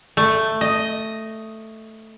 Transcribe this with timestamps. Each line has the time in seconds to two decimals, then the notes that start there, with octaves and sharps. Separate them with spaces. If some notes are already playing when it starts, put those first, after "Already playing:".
0.17 A3
0.61 D#5